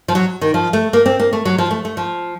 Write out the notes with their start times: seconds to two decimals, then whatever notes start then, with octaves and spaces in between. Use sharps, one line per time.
0.08 F3
0.15 F#3
0.41 D#3
0.54 F3
0.73 A3
0.93 A#3
1.06 C4
1.20 A#3
1.33 A3
1.45 F#3
1.58 F3
1.71 A3
1.85 A3
1.97 F3